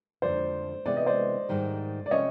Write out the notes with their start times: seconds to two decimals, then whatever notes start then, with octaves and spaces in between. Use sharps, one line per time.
0.22 F2 D3 F3 C5 D5
0.86 C3 E3 G#3 B3 D5
0.97 D#5
1.06 C5 D5
1.49 G#2 D#3 G3
2.06 D5
2.11 C3 F3 A3 C#4 C#5 D#5